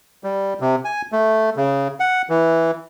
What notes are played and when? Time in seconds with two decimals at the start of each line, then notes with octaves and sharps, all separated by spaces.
0.24 G3
0.60 C3
0.85 G#5
1.12 A3
1.56 C#3
2.00 F#5
2.30 E3